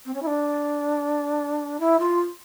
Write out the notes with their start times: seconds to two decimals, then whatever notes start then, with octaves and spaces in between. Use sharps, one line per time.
0.05 C4
0.14 C#4
0.22 E4
0.26 D4
1.80 E4
1.99 F4